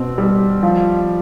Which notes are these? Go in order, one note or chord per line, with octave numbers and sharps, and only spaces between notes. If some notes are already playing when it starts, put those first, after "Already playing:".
Already playing: B2 C4
G3
F3